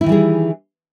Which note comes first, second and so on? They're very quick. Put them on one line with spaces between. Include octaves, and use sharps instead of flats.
E4 D#3 E3 G3 G#4